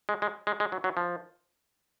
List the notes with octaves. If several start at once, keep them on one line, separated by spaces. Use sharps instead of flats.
G#3
G#3
G#3
G#3
F#3
F#3
F3